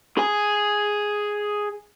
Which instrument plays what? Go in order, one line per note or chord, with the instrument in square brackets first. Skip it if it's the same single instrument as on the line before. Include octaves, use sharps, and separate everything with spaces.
[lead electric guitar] G#4 G#5